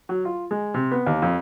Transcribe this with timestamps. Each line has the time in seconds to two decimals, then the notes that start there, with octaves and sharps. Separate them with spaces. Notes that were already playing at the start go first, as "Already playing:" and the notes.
0.09 F#3
0.25 F4
0.51 G#3
0.74 C3
0.91 B3
1.06 D#2
1.22 F2